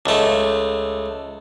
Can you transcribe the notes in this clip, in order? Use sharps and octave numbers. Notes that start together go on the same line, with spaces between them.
C#2 A3